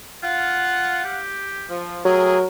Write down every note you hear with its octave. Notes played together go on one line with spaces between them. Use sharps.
F4 F5 F#5
G4
F3
F#3 A3 G4 G#4 A#4